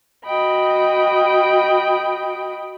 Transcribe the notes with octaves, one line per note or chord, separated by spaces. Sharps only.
F#4 D#5 G5 B5